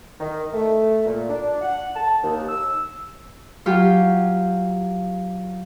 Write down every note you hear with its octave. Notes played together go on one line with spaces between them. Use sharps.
D#3
A3
A#2
D4
F#5
A5
D#2
E6
F#3 F4 G4